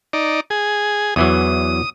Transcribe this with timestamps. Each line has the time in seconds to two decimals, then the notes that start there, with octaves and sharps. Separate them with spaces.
0.13 D#4 D5
0.50 G#4
1.16 E2 E3 F#3 D#6